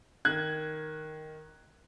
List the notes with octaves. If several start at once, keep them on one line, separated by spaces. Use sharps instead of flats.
D#3 F#6 G#6